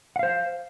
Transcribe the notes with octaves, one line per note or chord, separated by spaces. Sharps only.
C5 F5 F#5